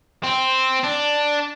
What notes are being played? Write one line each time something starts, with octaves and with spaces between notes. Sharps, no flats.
C4
D4